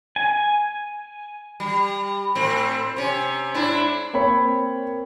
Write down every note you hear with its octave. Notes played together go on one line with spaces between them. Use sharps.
G#5
G3
A2 C4
C3 C#4
G#2 D4 E4
A#3 C4 C#5 B5